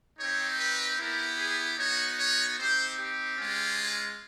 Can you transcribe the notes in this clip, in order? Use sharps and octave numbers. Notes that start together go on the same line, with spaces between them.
C4 D#4 G4 C#5
B4
B3 E4 G4 A#4
G#4
B3 D#4 F#4 C#5
C#5
C4 D#4 G4 C5
G4
G#3 C#4 F4